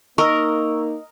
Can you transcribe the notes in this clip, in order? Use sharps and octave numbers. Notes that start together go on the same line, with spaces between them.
A#3 D#4 A#4 D#5 C#6 E6